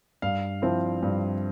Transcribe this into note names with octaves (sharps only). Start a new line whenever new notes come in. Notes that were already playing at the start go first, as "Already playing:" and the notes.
G2 F5
F3 C4 E4
G2